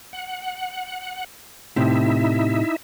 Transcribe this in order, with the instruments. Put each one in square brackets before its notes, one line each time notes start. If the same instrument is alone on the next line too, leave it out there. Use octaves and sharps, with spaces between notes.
[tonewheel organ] F#5
[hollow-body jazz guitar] A2 C3 [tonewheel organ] D#4 E4 E5